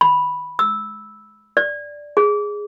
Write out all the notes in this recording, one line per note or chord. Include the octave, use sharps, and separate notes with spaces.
B5
E6
D5
G#4